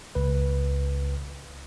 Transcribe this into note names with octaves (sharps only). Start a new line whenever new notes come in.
C#2 C#3 B4